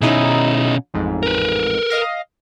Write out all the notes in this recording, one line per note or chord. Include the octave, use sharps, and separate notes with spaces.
B2 C#4 D#4 E4 G#4
A1 F2 G#2
A#4 B4
D#5 F5 A#6